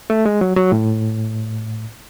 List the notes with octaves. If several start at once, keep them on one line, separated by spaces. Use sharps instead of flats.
A3
G#3
F#3
F#3
A2